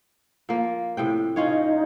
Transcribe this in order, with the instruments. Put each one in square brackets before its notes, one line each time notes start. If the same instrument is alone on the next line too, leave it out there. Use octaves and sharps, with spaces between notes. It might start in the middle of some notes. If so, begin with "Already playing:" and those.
[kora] F3 A#3
A2 C3 G5
[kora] C#4 F4 C#5 [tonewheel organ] D#4